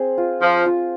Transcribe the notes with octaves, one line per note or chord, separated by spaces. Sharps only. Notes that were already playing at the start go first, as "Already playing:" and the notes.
Already playing: C4 G#4
F4
F3 F4
F4